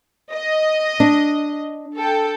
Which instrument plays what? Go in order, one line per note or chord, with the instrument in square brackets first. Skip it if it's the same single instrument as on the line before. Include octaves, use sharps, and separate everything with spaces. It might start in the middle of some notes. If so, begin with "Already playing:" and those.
[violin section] D#5
[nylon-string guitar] D4
[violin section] A4 G5